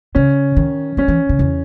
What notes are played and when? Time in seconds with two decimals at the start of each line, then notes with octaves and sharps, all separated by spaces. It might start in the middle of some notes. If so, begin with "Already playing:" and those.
0.15 C#3 C#4
0.57 D#3
0.97 F#3 C#4
1.08 E3
1.29 C#3
1.39 E2